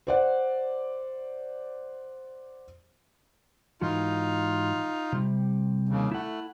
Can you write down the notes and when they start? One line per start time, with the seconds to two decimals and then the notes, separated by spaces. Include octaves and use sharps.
0.07 C5 D5 F#5
3.81 G#2 E3 D#4 F4 F#4
5.13 C3 G3
5.89 D#2 C#3
6.11 A3 E4 F#5